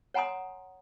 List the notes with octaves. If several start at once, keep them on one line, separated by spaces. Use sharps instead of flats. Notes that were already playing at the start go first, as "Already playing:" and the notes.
C#5 F#5 G#5 A#5 C6 D#6